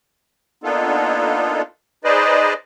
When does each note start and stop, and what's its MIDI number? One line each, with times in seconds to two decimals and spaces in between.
0.64 1.62 58
0.64 1.62 59
0.64 1.62 62
0.64 1.62 63
0.64 1.62 65
0.64 1.62 69
2.04 2.54 63
2.04 2.54 68
2.04 2.54 71
2.04 2.54 72
2.04 2.54 74
2.04 2.54 75